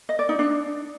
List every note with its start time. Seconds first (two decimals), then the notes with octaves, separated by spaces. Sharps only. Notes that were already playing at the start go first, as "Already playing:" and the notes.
0.09 D#5
0.19 D5
0.29 D#4
0.39 D4